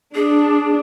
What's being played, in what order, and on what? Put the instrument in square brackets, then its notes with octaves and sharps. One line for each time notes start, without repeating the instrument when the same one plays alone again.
[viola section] D4 [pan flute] G#4